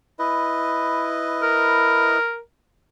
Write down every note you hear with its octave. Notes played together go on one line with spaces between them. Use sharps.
E4 B4 D#5
A#4